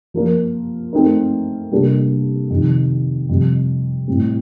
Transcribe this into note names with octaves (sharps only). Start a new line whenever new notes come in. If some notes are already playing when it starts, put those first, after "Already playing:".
F3 A#3 F4 A#4
A3 C4 D#4 A#4
C3 G3 A#3 D4 A4
F2 C3 D#3
F2 C3 G3
A2 G3 C4